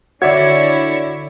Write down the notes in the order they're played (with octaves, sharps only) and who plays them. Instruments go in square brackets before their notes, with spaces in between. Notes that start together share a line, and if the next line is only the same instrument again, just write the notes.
[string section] D3 E4 [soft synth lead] F#4 [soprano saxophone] C#5 [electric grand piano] D5 E5 G#6